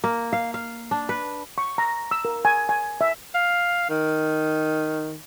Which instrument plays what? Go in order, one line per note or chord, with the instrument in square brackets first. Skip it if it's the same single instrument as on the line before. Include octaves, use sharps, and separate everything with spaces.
[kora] A#3
F5
F5
D4
B4
[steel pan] C#6
A#5
E6
A#4
G#5
G#5
E5
[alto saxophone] F5
D#3